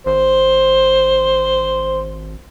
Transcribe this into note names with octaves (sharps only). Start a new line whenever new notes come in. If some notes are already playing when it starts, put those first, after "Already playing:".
G#1 C5